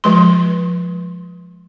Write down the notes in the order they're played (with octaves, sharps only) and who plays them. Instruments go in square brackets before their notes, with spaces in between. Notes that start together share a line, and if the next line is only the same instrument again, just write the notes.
[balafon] F3 G#3 C6